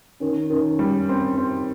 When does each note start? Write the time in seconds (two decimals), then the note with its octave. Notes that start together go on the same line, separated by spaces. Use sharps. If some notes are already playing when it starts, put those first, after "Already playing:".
0.21 D#3 C#4
0.50 D#3 C#4
0.79 G3
1.09 C4
1.37 C4